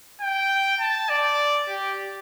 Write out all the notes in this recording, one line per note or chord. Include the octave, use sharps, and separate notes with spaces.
G5
A5
D5
G4